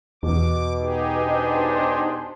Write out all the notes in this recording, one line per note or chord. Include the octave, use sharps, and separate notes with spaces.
E2 B2 D6
D#4 G4 G#4
D4 C5 C6